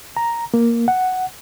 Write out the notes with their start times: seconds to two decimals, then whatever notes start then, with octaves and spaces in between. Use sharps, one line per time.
0.17 A#5
0.54 A#3
0.88 F#5